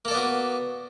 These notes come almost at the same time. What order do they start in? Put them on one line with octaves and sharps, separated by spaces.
A#3 A4 D5 B3 F#4